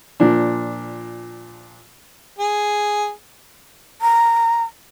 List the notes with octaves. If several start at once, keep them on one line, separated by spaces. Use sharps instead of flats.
A#2 F3 D4
G#4
A#5